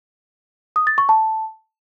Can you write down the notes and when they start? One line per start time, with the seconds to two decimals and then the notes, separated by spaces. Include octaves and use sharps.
0.76 D#6
0.87 A6
0.98 C#6
1.09 A5